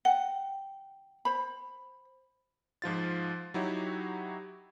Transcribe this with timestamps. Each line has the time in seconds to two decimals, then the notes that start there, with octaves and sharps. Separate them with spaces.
0.05 F#5 G5
1.25 C5 B5
2.82 G#2 F3 F4 A6
3.54 F#3 D#4 E4 F#4 G4 C#5